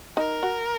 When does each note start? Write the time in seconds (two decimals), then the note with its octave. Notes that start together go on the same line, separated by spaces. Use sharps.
0.17 D#4 A#4
0.43 F#4